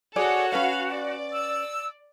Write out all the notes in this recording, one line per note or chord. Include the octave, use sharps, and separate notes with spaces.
F#4 G#4 A4 C#5 D5 F#5
C#4 B4 F5 F#5
D5
E6